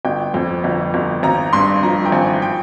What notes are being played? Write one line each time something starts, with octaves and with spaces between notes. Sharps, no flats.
G1 G5
F2
G1
G1
G#1 A#5
G2 C6
F3 A#5
G5
G#1 G#5
G5